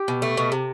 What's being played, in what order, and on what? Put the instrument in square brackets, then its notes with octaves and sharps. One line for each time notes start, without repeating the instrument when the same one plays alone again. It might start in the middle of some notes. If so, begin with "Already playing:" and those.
Already playing: [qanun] G4
[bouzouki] B2
A3
B2
C3